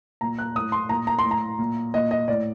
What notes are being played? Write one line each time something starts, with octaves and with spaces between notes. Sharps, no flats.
A#2 A#5
F#6
A2 D#6
C6
A#2 A#5
A#5
C6
A2
A#5
A#2
A#2 D#5
D#5
A2 D5